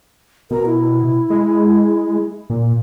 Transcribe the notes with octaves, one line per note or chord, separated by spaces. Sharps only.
B2 A#4
E4
G#3
A#2